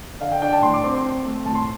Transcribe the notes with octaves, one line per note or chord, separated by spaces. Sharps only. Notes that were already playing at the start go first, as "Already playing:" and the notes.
D3 F5
G5
D4 G5
A5
A2 C6
D6
C4 C6
C6
C4
A3
A2 A5
C6